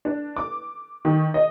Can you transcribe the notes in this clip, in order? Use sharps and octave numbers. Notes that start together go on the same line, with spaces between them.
D4
D6
D#3
D#5